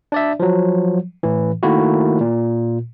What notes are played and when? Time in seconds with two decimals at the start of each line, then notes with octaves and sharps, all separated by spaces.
0.12 D4 D5 E5
0.40 F3 F#3
1.23 A2 E3
1.63 D#3 A3 A#3 E4 F#4
2.21 A#2